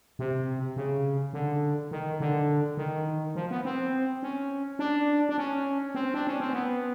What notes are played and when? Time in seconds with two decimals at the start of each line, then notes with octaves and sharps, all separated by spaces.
0.19 C3
0.76 C#3
1.33 D3
1.91 D#3
2.20 D3
2.77 D#3
3.36 F3
3.51 B3
3.65 C4
4.23 C#4
4.79 D4
5.29 D4
5.38 C#4
5.95 C4
6.14 D4
6.27 C#4
6.40 C4
6.53 B3